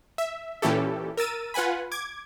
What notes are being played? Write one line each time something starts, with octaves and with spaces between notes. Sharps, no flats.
E5
A#2 E3 C#4 E4 G4 A4
A#4 E6 A6 D#7
F4 B4 F#5 G#5 B5
D6 G#6